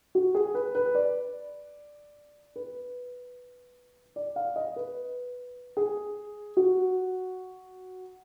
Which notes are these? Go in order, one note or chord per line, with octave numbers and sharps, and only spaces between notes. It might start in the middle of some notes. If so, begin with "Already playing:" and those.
F#4
G#4
B4
B4
D5
B4
D5
F5
D#5
B4
G#4
F#4